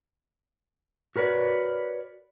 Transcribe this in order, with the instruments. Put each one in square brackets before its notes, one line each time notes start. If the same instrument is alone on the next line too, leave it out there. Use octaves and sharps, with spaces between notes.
[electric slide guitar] F#4 A#4 B4 C#5 D5